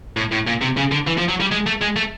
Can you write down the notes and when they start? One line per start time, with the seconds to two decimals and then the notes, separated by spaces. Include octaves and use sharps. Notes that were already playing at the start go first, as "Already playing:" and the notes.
0.17 A2
0.32 A2
0.47 A#2
0.62 C3
0.77 C#3
0.91 D3
1.07 E3
1.18 F3
1.29 F#3
1.40 G3
1.52 G#3
1.66 A3
1.81 G#3
1.96 A3